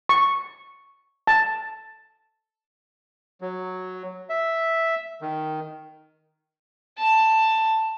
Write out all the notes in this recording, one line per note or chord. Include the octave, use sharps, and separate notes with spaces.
C#6
A5
F#3
E5
D#3
A5